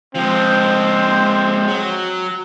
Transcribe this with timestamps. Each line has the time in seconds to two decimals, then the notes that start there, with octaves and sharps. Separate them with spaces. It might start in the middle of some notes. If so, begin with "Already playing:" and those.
0.15 F3 G#3 C4
1.68 F#3